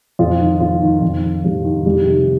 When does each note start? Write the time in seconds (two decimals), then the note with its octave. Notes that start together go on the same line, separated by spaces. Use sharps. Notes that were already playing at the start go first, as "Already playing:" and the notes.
0.19 F2 F4
0.40 D#3
0.60 F2 F4
0.81 D#3
1.02 F2
1.23 D#3
1.44 F2 G3
1.64 D#3
1.85 F2 G3
2.06 C3 D#3